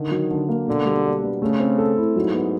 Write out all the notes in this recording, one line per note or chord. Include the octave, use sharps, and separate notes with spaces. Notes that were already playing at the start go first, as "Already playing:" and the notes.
Already playing: D3 D#3
F#3
D3
A#3
B2 D3
G3
D4
B3
C#3 A3
C4
A4
E4
G#2 F#3
B3